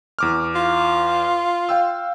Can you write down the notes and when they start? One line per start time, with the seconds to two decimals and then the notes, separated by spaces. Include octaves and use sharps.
0.19 E2 D6 F6
0.55 F4
1.69 F5 G5 E6